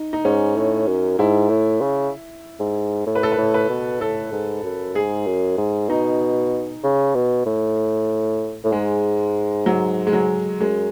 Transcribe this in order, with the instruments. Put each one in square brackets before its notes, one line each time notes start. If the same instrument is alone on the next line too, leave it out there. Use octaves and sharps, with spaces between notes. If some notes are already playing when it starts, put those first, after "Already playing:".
Already playing: [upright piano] D#4
D#4
[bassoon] G#2 [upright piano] C#4
[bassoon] A2
F#2
[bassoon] G#2 [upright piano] E4
[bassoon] A2
C#3
G#2
A2
[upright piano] B4
A4
B4
[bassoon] A2
[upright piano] B4
[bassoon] B2
[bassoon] A2 [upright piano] A4
[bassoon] G#2
F#2
[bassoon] G#2 [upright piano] G#4
[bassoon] F#2
G#2
[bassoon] B2 [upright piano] D#4
[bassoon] C#3
B2
A2
A2
[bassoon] G#2 [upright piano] G#3
[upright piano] F#3
G#3
F#3
[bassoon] F#2 [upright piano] G#3